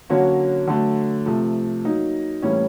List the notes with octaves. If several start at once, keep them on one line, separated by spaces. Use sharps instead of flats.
D3 F#3 A#3 C#4 F#4
D3 F#3 A3
C3 F3 A3
F#3 A#3 D#4
A2 E3 G3 A#3 C#4